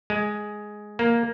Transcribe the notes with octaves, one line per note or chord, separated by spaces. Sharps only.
G#3
A#3